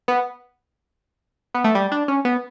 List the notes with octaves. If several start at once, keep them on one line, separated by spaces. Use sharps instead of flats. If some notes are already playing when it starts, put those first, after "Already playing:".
B3
B3
A3
G3
D4
C#4
B3